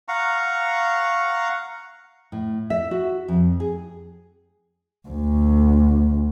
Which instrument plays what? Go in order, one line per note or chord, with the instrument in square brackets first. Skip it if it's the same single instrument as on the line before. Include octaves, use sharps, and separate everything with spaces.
[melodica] F5 F#5 A#5 C#6
[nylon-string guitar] A2
E5
F#4
F2
G#4
[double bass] D2